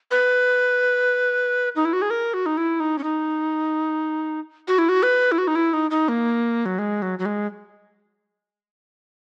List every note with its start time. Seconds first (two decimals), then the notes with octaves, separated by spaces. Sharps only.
0.11 B4
1.76 D#4
1.85 E4
1.93 F#4
2.02 G#4
2.10 A#4
2.34 F#4
2.46 D#4
2.57 E4
2.80 D#4
2.98 C#4
3.04 D#4
4.68 F#4
4.78 E4
4.89 F#4
5.03 B4
5.32 E4
5.38 F#4
5.47 D#4
5.55 E4
5.73 D#4
5.91 D#4
6.09 A#3
6.66 F#3
6.79 G#3
7.02 F#3
7.19 F#3
7.26 G#3